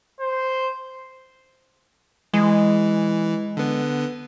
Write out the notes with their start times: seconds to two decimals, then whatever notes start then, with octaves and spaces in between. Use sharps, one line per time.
0.20 C5
2.34 E3 G#3
3.57 D3 B3